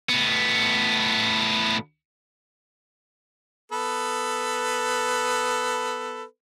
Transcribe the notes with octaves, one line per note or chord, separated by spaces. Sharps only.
A2 B3
B3 A4 B4